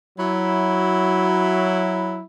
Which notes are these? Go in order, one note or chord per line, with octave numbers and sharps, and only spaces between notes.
F#3 E4